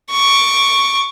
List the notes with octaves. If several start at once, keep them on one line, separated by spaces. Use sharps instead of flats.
C#6 D6